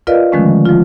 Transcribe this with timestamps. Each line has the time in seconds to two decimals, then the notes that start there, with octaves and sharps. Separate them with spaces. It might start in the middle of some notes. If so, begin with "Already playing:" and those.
0.07 F4 A#4 B4 D5 D#5 F5
0.32 D3 D#3 F3 G#3 A3 C#4
0.65 F3 F4